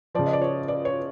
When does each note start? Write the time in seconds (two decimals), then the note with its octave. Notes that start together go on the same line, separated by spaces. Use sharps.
0.15 C#3 F3 D5
0.26 D#5
0.33 D5
0.42 C#5
0.68 D5
0.85 C#5